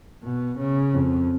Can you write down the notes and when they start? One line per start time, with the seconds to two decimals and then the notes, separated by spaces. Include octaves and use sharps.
0.24 B2
0.58 C#3
0.94 F2